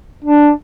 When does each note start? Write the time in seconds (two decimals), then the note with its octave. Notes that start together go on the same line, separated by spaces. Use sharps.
0.24 D4